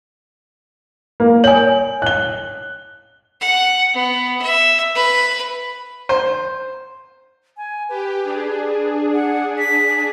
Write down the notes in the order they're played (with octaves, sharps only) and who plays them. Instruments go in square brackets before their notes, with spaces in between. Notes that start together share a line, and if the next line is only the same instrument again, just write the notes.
[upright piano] A#3
[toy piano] C#5 G#5 [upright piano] F#7
[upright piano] F#6 G7
[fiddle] F#5
B3
E5
B4
[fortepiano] C5
[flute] G#5
[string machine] G4 [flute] B4
[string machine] D4 G#4
[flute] F#5
B6